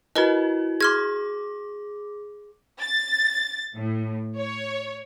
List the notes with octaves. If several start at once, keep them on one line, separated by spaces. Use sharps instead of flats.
E4 F#4 A#4 B4 D#5
G#4 C6 D6 F6 G#6
A6
A2
C#5